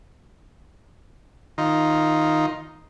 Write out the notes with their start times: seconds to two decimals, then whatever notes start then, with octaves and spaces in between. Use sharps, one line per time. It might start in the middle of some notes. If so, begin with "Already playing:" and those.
1.58 D#3 D#4 F4